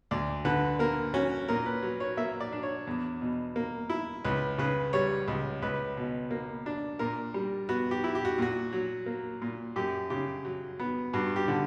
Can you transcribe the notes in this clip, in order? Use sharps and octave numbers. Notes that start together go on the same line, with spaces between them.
D2 D5
D3 B4
A#3 A#4
C#4 F#4
A#2 A#4
B4
F#3
C#5
A#3 E5
D5
D4
C#5
E2
B2
A#3
E4
C#2 B4
C#3 B4
G3 C#5
C#2
C#2 B4
B2
A#3
D4
A#2 A#4
G3
B3 F#4
G4
E4
G4
F#4
A#2 F#4
F#3
A#3
A#2
F#2 G4
C#3 G4
F#3
B3
G2 F#4
G4
D3